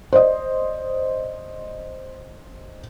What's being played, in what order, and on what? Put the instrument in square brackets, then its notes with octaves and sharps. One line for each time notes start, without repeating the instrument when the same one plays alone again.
[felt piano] C5 D5 D#5